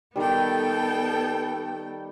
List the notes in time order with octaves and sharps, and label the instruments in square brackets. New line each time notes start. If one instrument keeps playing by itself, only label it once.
[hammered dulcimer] D#3 G3 [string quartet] B3 A4 G5